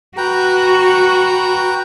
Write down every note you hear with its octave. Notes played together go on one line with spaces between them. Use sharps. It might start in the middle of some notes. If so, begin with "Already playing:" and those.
F#4 B4 G5 A#5